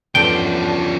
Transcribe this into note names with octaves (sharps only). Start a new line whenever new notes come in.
E2 G2 F3 A3 C#4 D4 G5